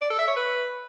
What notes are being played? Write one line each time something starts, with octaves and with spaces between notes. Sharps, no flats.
D5
A4
E5
C#5
B4